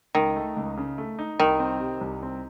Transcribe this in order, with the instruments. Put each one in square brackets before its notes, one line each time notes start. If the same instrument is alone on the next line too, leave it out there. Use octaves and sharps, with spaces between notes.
[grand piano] C#2 [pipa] D#3
[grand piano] A3
C#2
C#3
A3
D#4
[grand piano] C2 [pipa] D#3
[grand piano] C4
C3
C2
C4